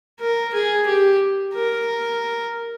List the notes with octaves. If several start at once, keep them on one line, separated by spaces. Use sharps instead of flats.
A#4
G#4
G4
A#4